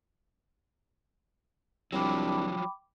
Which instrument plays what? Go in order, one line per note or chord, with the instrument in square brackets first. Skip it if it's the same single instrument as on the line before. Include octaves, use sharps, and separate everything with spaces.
[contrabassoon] C2 [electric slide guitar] F3 F#3 [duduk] D4 [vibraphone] G5 B5 D6